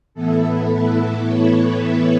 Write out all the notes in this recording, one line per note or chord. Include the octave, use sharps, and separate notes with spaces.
A2 E3 B3 E4 A4
B4
C#5
E5